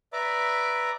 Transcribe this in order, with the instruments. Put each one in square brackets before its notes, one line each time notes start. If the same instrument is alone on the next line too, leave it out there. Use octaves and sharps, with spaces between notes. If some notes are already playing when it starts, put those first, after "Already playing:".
[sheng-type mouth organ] B4 D5 E5 A#5 D6